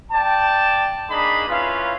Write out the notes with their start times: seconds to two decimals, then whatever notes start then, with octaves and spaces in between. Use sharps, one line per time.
0.12 D5 G5 A5
1.10 A#3 D4 D#4 G#4 B5
1.49 C#4 E4 F4 B4 F5